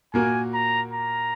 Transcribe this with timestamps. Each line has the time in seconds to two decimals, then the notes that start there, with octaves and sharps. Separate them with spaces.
0.14 A#2 A#3 F#4 A#4 G#5
0.53 A#5
0.93 A#5